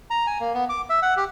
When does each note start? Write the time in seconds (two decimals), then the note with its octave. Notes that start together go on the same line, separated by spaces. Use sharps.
0.10 A#5
0.27 G#5
0.40 A#3
0.54 B3
0.69 D6
0.90 E5
1.02 F#5
1.17 G4